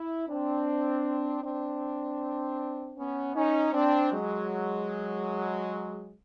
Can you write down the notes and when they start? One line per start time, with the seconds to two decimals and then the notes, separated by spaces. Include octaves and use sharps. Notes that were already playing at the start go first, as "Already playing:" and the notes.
Already playing: E4
0.28 C4 D4
1.44 C4 D4
2.97 B3 C#4
3.35 C#4 D#4
3.73 C4 D4
4.12 F#3 G#3